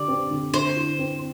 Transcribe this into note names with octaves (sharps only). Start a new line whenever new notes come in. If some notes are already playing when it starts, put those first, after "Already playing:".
Already playing: D3 G4 D5
C4
D3
D3 C5
E4
C4